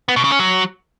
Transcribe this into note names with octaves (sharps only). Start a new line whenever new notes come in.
B3
B2
C#3
C#4
F#3